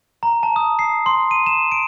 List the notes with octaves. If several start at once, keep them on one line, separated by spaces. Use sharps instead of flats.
A#5
A5
D#6
C7
C6
D#7
E7
D7